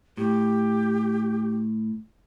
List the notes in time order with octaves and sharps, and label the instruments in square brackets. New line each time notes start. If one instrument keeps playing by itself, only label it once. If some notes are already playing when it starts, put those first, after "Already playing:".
[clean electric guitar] A2 [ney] G4